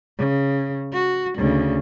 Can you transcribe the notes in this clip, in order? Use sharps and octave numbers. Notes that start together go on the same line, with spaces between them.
C#3
F#4
D2 C#3